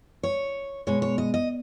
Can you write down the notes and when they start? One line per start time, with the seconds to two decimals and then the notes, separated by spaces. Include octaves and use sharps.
0.23 C#5
0.87 B2 G#3 C#5
1.02 C#5
1.18 D#5
1.34 D#5